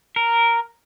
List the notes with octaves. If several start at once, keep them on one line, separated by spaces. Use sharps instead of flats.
A#4